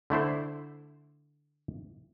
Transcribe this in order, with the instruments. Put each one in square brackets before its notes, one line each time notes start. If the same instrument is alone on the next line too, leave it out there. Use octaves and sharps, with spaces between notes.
[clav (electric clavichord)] D3 A3 E4 C5